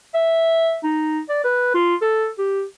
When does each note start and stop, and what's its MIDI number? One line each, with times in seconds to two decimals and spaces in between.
0.14 0.77 76
0.83 1.20 63
1.29 1.40 74
1.44 1.73 71
1.74 1.95 65
2.01 2.27 69
2.38 2.64 67